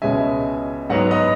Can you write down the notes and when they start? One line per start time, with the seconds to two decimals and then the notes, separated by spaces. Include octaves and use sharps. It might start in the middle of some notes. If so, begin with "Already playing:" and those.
0.02 C#2 B2 G#3 C#4 E5 G#5
0.90 G#2 F#3 B3 D#4 D#5 F#5
1.11 B4 D#5